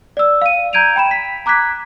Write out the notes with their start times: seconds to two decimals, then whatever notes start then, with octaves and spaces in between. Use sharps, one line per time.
0.17 D5 E6
0.42 F5 D#7
0.73 A#5 G6 G#6 D7 D#7 F7
0.96 G5 B5 E7
1.11 B6
1.46 A#5 D6 F#6 G#6 B6